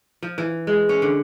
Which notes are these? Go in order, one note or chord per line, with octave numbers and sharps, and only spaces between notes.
F3
E3
G#3
C#4
D3